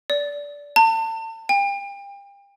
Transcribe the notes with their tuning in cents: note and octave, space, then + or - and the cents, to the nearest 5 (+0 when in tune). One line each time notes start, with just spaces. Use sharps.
D5 -20
A5 +35
G5 +35